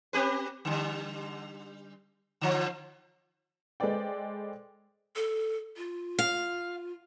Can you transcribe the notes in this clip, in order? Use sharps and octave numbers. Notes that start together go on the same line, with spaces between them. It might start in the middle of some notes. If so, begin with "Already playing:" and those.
C4 G4 B4
D3 G3
D3 F3
G#3 A4 B4 C5 D5 G5
A4
F4
F5